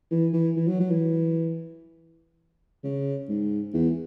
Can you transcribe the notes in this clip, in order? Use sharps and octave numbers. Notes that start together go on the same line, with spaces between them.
E3
E3
E3
F#3
F#3
E3
C#3
G#2
E2